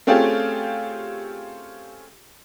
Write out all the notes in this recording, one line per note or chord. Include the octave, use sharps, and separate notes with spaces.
A3 C4 C#4 F4 G4 G#4